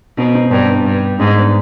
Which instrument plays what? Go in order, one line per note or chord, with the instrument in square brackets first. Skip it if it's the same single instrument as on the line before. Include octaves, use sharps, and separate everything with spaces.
[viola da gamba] B2 [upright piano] C4 D#4
[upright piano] C4 D#4
[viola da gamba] G2 [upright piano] B3 D4
[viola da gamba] G2
[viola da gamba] G#2 [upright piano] C4 D#4
[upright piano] C4
B3 D4